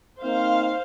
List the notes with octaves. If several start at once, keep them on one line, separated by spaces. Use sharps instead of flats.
A#3 C4 D#4 C5 F5